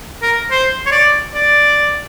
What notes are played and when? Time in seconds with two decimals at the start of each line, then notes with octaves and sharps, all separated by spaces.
0.22 A#4
0.51 C5
0.86 C#5
0.92 D5
1.34 D5